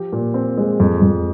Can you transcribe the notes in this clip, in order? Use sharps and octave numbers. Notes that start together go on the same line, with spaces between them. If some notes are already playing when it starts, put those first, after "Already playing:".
Already playing: F3 G4
A#2
C4
G#3
F2
F2